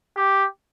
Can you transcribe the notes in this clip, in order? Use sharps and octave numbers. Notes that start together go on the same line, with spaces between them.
G4